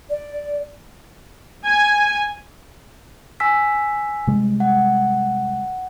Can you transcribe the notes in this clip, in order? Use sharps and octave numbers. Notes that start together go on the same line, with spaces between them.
D5
G#5
G#5 E6 B6
C3 G3 G#3
F#5